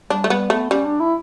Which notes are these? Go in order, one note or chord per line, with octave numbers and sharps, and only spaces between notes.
G3 D4
A3
G3 B3
A3 B3
G3 C#4
D4
E4